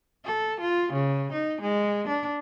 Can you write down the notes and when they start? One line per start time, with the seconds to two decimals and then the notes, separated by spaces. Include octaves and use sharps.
0.25 A4
0.61 F4
0.93 C#3
1.33 D#4
1.62 G#3
2.08 D4